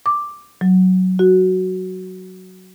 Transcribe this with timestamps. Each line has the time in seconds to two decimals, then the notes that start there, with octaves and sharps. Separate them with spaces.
0.06 D6
0.61 F#3
1.19 F#4